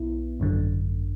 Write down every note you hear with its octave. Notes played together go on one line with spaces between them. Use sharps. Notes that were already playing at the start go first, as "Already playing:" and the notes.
Already playing: B1 B3 E4
G#1 F#2 D3